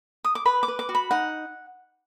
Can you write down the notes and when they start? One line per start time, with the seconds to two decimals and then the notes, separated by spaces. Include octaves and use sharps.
0.25 D#6
0.35 D6
0.45 B4 B5
0.63 D6
0.68 B4
0.79 D6
0.89 F#4
0.95 B5
1.11 D#4 F#5